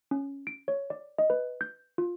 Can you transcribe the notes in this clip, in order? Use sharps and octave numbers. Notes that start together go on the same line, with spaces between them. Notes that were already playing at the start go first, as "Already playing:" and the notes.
C#4
D7
C#5
D5
D#5
B4
G6
F4